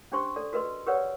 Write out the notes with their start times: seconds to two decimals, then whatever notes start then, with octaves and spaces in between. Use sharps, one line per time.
0.12 C#4 D4 G4 C5 C6 C#6
0.36 A4 D5
0.53 F#4 A#4 B4 D#5 C6
0.86 G4 A#4 B4 C#5 D5 F#5